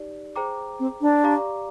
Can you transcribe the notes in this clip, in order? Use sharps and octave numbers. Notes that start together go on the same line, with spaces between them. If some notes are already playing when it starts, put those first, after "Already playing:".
Already playing: D#4 G4 D5
G#4 C5 G5 A#5 D6
C4
D4
G4 D5 F5 A#5 D6